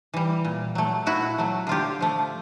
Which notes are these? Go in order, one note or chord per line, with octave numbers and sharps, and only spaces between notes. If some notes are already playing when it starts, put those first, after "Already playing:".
E3 G3
A#2
F#3 A3
A#2 E4 F#4
F#3 A3
D3 F4 G4
F3 A3